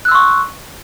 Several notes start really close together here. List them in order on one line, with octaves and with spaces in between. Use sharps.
F#6 E6 C6 C#6